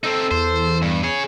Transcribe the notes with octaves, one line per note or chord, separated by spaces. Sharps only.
C4 D#4 A4
E2 C5
G2
G#4 C#5